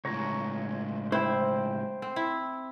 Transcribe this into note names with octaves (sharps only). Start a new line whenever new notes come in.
C#2 A2 C#5 A#5
E4 C5 G5
C4
E4